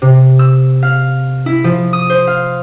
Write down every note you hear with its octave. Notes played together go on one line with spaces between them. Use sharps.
C3
E6
F5
E4
F3
D#6
C5
F5